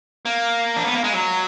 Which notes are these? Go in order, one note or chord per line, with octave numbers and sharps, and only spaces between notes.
A#3
D4
B3
A#3
G#3
F#3